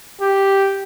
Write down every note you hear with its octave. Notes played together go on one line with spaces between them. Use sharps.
G4